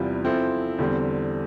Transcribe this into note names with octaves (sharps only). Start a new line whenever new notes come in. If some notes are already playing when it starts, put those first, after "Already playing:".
Already playing: E2 C3 G3 B3 F4
F3 C4 E4 A4
E2 D3 G3 C4